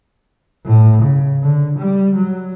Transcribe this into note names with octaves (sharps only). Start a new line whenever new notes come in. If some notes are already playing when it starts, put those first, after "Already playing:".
A2
C#3
D3
G3
F#3